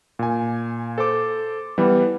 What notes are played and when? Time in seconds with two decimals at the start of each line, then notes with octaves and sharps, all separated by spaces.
0.19 A#2 G#5
0.98 A4 C5 D6
1.78 E3 G3 B3